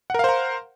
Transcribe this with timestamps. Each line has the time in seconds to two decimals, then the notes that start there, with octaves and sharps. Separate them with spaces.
0.10 F#5
0.14 A#4
0.19 F5
0.24 C5
0.29 A#5